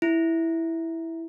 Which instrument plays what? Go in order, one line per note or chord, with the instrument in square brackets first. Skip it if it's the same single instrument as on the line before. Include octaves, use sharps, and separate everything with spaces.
[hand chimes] E4